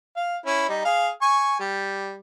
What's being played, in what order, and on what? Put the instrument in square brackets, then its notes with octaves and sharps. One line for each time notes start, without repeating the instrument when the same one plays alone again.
[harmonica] F5
C#4 E4
G3 D#4
G#4 F5
G#5 C#6
G3